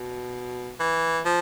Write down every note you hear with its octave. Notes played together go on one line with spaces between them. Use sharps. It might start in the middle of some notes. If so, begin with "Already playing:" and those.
Already playing: B2
E3
F3